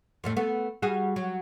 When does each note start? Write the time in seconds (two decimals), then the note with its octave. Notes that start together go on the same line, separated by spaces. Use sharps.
0.24 F2 A2 A3
0.37 A3 B3
0.82 G3 F#4 G#4
1.16 F#3